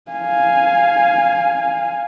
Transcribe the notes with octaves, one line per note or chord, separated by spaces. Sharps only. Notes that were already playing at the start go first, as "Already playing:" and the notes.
F5 G#5